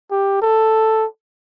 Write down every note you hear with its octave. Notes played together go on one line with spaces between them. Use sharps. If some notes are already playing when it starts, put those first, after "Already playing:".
G4
A4